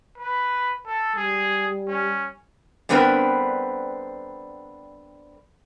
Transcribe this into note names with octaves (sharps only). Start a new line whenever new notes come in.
B4
A4
G3 G#4
C#4
D3 G3 B3 C4 A#4 B4